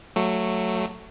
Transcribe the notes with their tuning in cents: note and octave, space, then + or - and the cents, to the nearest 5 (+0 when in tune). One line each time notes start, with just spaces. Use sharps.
F#3 +0 A3 +10